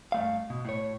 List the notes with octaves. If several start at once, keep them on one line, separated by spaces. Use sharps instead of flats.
G2 A3 F5
B2
A2 C#5